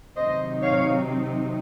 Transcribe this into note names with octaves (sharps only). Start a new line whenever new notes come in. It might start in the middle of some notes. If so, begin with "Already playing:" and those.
C3 D#3 F#3 C4 D#4 C5 D#5
C#5 F5